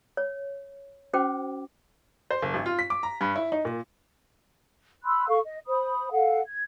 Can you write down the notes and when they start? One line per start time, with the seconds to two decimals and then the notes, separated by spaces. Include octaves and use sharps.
0.17 C#5
1.13 C#4 F#4 C5 G5 D6
2.31 C5
2.42 F#1
2.54 G#1
2.66 F4
2.79 B6
2.90 D6
3.03 A#5
3.21 G2
3.36 E4
3.52 D#4
3.65 A#2
5.04 B5 C6 E6 F#6
5.28 A4 F5 C#6
5.45 D#5
5.67 C5 B5 D#6
6.11 A4 F5 F#5
6.47 G#6